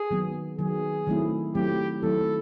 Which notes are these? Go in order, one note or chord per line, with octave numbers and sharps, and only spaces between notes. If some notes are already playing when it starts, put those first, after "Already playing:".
Already playing: G#4
D#3 F#3 B3
D#3 F#3 B3 G#4
D#3 F#3 A3 C4 E4
D#3 F#3 A3 C4 E4 G4
D#3 F#3 A3 C4 E4 A4